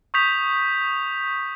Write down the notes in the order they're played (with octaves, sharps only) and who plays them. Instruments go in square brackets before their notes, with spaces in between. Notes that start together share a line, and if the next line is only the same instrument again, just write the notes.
[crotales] C#6 D#6 G6 B6 F7